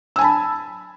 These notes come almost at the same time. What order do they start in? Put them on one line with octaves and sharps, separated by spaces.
E6 G#5 A5 B5